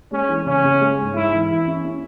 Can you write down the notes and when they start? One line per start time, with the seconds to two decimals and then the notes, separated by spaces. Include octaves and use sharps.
0.11 G#3 C#4
0.29 E3
0.46 C#3 C#4
0.64 C#3
0.81 G#3
0.99 G#2
1.15 G#2 E4
1.33 E3
1.50 E3 E4
1.67 C#4
1.85 C#4